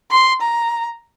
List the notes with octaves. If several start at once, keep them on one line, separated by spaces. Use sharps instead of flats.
C6
A#5